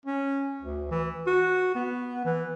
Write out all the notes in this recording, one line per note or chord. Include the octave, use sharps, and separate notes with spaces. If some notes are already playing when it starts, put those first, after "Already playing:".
C#4
D2
E3
F#4
B3
E3